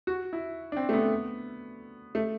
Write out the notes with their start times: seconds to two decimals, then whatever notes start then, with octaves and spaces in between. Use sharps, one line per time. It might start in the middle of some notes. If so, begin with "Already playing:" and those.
0.07 F#4
0.33 E4
0.72 D4
0.77 C4
0.89 A3
0.93 B3
2.15 A3